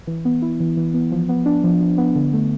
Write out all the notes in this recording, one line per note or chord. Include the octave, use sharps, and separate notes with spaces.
E3
B3
E4
E3
E3
B3
F3
B3
D4
F3
F3
B3
D3
A3